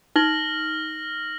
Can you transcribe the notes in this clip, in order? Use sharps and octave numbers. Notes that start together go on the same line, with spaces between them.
D#4 F6 A#6 F#7